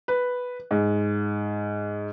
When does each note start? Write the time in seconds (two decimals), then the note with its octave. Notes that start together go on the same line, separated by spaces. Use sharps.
0.08 B4
0.71 G#2